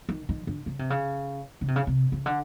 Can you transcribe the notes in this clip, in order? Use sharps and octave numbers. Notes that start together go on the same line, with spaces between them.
D#3
D#3
D3
C#3
C3
C#3
C#3
C3
C#3
C3
C#3
D3